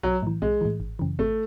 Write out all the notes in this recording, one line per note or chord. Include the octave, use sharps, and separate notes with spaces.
B1 F#3
A2 E3
B1 G#3
A2 E3
G#1
F#2 C#3 E3
G#1 A3